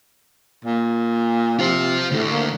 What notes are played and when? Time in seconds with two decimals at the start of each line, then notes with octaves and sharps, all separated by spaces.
0.65 A#2
1.59 C3 F4 C5
2.11 D2 A2
2.30 A#3